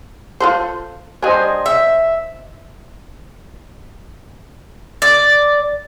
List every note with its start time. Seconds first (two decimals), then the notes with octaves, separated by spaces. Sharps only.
0.40 F4 A4 C5
1.22 G3 D4 C5 D#5 G#5
1.66 E5
5.02 D5